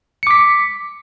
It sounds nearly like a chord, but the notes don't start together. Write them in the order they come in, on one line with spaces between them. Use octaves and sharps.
C#7 D6 B6